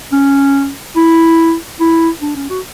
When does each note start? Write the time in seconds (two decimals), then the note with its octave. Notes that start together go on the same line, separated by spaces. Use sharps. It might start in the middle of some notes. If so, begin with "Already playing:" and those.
0.12 C#4
0.96 E4
1.80 E4
2.22 D4
2.36 C#4
2.50 F#4